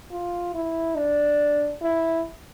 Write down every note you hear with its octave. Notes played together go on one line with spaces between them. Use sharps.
F4
E4
D4
E4